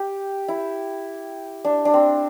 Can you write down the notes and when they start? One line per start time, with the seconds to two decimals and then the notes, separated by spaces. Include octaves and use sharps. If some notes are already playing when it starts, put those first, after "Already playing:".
Already playing: G4
0.48 E4
1.64 D4
1.85 D4
1.94 C4